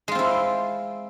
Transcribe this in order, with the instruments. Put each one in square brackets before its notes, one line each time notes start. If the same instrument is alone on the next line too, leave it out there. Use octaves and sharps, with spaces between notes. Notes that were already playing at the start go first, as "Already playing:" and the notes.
[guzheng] G#3
F4
C4
E4